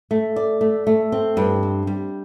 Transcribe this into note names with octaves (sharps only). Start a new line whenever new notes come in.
A3
D5
A3
A3
C4
G2
C4
G3